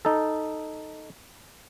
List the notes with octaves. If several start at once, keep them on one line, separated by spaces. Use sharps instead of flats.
D#4 A4